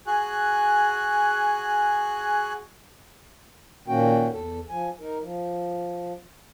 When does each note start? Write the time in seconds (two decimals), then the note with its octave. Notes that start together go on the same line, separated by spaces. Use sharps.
0.07 F#4 G#4 G#5 F#6
3.88 A#2 D#3 A#3 C#4 F#4 G5
4.33 E2 A4
4.69 F3 G#5
5.00 D#4 A#4
5.21 F3